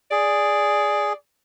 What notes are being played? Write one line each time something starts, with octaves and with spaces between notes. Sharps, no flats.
G#4 D5